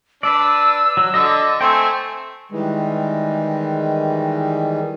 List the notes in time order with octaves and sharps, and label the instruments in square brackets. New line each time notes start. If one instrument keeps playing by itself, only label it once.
[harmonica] D4 [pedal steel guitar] B4 D5 [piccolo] E6
[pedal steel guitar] F#3
[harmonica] D3 [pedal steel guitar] D5 D#5
[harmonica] A3 C4 [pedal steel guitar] G5 G#5
[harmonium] D#3 E3 G3 G#3